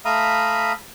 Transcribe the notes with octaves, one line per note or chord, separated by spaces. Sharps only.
A3 E5 F5 A#5 B5 D#6